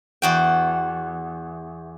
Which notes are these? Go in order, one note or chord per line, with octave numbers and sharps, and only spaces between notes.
E2 F#4 G5